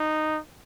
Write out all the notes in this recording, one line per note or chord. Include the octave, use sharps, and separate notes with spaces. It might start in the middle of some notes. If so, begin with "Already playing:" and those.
Already playing: D#4